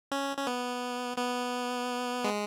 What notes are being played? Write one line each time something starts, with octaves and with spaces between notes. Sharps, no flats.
C#4
C#4
B3
B3
G#3